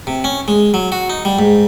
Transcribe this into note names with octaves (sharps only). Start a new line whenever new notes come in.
C3
C#4
G#3
F#3
F#4
D#4
G3
G#2